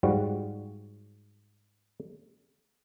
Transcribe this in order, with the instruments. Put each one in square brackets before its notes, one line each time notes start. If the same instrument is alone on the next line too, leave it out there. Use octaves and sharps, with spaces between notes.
[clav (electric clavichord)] G#2 G3 F4 F#4